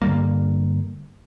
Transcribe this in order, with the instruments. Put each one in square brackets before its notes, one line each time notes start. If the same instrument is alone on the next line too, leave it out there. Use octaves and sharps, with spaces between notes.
[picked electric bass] G2 D3 G3 A#3